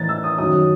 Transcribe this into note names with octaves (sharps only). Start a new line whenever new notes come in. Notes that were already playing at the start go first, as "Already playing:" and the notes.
Already playing: A2 E3 A6
E6
D#6
F#2 D#3 F#3 D#6